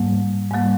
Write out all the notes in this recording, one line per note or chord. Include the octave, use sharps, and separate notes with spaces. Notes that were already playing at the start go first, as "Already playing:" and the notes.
Already playing: G#2 G3 A#3
G#2 G3 A#3